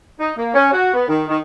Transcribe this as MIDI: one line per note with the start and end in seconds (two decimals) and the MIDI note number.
0.19 0.32 63
0.37 0.50 58
0.54 0.71 61
0.72 0.92 66
0.94 1.06 59
1.08 1.22 51
1.28 1.37 51